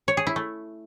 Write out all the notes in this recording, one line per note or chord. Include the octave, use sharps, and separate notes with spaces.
C#5
G#4
E4
A3